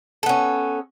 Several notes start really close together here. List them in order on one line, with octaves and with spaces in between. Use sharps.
A4 B3 C#4